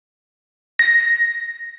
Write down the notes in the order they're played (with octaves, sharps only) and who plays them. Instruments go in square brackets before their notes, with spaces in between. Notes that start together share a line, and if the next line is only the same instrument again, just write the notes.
[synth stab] A#6